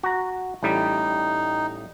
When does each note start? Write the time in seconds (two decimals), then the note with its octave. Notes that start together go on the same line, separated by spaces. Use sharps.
0.03 F#4 A#5
0.63 A1 A2 G3 D#4